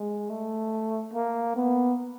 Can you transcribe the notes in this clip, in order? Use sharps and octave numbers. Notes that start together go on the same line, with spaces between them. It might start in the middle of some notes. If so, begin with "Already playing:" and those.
Already playing: G#3
A3
A#3
B3